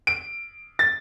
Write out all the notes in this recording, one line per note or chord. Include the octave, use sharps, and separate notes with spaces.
D7
A6